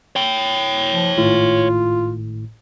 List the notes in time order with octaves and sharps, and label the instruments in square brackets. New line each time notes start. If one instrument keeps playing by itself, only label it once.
[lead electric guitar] C#5 G5
[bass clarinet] F3
[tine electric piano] G#1 A2 [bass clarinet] F4